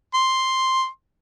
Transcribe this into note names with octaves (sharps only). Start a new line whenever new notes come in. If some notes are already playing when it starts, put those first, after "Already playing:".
C6